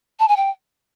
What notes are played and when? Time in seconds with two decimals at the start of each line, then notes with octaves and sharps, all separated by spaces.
0.19 A5
0.28 G#5
0.36 G5